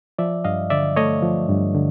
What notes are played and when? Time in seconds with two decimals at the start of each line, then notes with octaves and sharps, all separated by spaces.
0.19 F3 D5 E5
0.45 G2 D#5 F5
0.70 D3 D5 E5
0.96 A3 C#5 D#5
1.22 F3
1.49 G2
1.75 D3